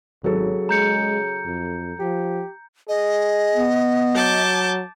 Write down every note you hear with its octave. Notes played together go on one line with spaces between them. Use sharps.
G#1 C#3 F#3 A4
G#3 A#5 G6 C#7
F2
F3 G4
G#4 D#5
B3
F#3 A5 D6 G6